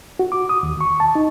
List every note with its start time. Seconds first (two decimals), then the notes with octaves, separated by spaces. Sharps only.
0.19 F#4
0.32 D6
0.49 D#6
0.63 D#2
0.81 C#6
1.00 A5
1.15 D#4